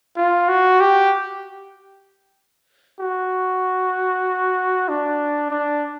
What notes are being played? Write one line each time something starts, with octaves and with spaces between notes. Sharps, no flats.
F4
F#4
G4
F#4
D4
D4